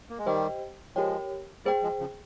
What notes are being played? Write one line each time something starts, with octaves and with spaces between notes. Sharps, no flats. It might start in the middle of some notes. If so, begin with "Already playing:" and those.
A#3
G#3
D#3 G3 G4 C5 D#5 G5
F3 G#3 G4 A#4 C#5 G5
G3 A#3 G#4 C5 G5
F3 G#3
C#3 F3